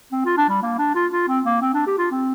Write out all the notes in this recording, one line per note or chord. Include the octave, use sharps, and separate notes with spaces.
C4
F4
D4
G3
A#3
D4
F4
F4
C4
A#3
C4
D4
G4
F4
C4